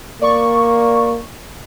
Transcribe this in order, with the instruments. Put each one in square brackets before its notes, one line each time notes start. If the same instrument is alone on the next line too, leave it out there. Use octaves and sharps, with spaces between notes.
[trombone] A#3 [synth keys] D5 C#6